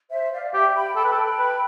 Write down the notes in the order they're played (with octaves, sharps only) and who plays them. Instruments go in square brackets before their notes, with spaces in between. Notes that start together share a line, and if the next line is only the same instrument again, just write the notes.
[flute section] C5 E5
D5 F5
[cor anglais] G4 [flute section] E5 G5
[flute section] G5 B5
[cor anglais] A4 [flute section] G5 B5
[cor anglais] B4
A4
B4